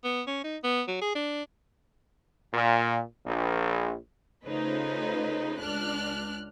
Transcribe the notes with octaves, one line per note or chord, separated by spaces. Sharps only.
B3
C#4
D#4
B3
F#3
G#4
D4
A#2
A#1
C#3 A3 D#4 F4 B4 C5
C#2 D4 F6 F#6